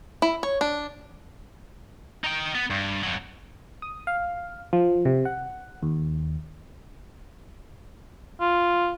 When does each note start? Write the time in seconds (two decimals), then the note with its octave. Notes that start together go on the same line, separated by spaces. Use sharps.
0.22 E4
0.43 C#5
0.61 D4
2.24 D#4 G5
2.55 B3
2.70 G2
3.03 F2 F#3
3.82 D#6
4.07 F5
4.73 F3
5.05 C3
5.25 F#5
5.83 D#2
8.41 F4